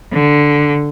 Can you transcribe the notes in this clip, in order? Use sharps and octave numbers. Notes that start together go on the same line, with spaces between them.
D3